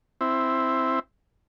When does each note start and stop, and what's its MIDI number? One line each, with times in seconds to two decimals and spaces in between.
0.21 0.99 60
0.21 0.99 64